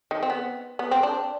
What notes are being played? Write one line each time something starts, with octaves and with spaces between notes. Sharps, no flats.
D#3
C4
B3
B3
C4
D4